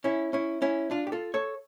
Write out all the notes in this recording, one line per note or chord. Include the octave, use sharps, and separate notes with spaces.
C#4 E4
C#4 E4
C#4 E4
D4 F4
G4
F4 A4
A4 C#5